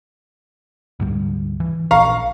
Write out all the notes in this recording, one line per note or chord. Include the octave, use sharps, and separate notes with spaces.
D2 G#2 G3
E3
A#1 F5 A#5 C#6